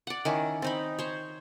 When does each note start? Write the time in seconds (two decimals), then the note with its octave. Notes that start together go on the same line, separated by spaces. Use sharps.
0.07 D5 F#5
0.25 D#3 C#4 E4
0.62 C4 D#4 B5
0.99 C5 C#5